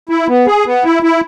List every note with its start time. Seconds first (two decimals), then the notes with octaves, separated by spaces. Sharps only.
0.09 E4
0.28 B3
0.47 G#4
0.66 B3
0.84 E4
1.03 E4